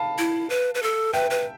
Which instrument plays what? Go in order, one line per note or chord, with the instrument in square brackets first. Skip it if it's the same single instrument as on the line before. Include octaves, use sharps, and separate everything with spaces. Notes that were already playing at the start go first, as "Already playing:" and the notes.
Already playing: [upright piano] F5 A5 B5
[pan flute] E4
B4
B4
A4
[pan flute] B4 [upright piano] E5 G5
[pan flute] B4